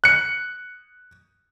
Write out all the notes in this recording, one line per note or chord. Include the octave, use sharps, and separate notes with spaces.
F#6 C#7